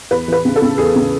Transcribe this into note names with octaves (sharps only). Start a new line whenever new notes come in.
E2 B4
E3 B4
C#3
A4
C#3
E2 G#4
C#3